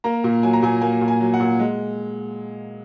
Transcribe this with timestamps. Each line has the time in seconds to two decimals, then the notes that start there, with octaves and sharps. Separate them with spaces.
0.04 A#3 A#5
0.24 A#2
0.43 F#3 G#5
0.53 A#5
0.63 A#2 G#5
0.82 A#3 G#5
1.01 A#2
1.08 G#5
1.20 F#3
1.34 F#5
1.40 A#2
1.59 G#3